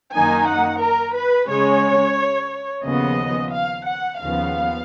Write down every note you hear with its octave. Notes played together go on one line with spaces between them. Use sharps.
F#2 D#3 A#3 D#4 G#5
F#5
A#4
B4
C#3 G#3 C#4 C#5
D#2 C#3 F3 B3 D#5
F5
F#5
D#2 C#3 F3 B3 F5